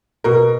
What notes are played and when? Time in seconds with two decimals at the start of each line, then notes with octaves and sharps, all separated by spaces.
0.24 B2 A#4